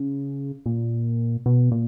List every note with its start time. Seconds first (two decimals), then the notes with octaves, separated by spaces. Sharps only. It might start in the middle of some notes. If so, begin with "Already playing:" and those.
Already playing: C#3
0.66 A#2
1.46 B2
1.72 A#2